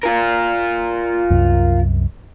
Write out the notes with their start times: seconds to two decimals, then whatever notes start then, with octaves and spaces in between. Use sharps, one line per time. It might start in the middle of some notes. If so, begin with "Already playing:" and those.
0.04 F4 A#4
1.30 C2 F#2